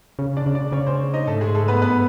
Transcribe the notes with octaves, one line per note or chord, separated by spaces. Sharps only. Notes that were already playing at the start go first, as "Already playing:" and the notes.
C#3
D4 D5
C#3
D4 D5
C#3 C#4 C#5
C4 C5
D#4 D#5
G#2 A3 A4
G#3 G#4
A3 A4
B3 B4
G2 B3 B4